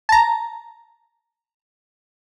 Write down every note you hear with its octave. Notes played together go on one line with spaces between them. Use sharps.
A5 A#5